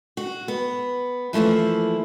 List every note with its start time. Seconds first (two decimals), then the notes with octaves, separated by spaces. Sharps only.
0.17 F#4
0.48 B3
1.33 E3 F3 A3 A#3 E4